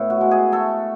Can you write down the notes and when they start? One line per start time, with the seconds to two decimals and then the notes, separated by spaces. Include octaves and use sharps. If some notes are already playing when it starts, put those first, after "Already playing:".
Already playing: A2 B3
0.10 F#4
0.21 G#3
0.31 G#4
0.52 A3 A4